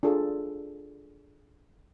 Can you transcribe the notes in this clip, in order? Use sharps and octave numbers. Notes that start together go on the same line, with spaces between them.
D4 F4 G#4 A4